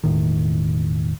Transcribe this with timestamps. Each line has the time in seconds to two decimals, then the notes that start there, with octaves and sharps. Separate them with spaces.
0.04 E1 A2 D#3